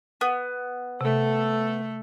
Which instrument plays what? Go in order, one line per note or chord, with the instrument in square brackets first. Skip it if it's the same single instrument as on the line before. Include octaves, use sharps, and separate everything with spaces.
[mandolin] B3
[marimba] C3 [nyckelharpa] A3 A4